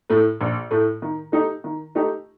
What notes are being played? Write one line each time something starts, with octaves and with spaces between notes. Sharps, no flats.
A2 A3
A#1
A2 A3
D#3
A3 D#4 G4
D#3
A3 D#4 G4